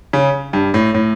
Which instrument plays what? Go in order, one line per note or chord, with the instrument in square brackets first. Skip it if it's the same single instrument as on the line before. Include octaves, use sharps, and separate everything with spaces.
[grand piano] C#3
G2
A2
A2